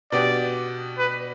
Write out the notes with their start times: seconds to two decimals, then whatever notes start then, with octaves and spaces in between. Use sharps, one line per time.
0.12 B2 B3 D4 G4 D5
0.98 B4